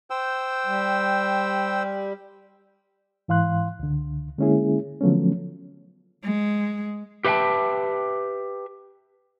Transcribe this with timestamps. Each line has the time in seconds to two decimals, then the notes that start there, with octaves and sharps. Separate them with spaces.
0.10 C5 G5 E6
0.66 G3
3.28 G#2 E3 F5 C6 F#6
3.79 C#2 D3
4.38 D3 G#3 A#3 C#4 E4 G#4
5.01 D3 F3 F#3 A3 B3 C#4
6.23 G#3
7.25 G4 B4 E5 F5 G5 A5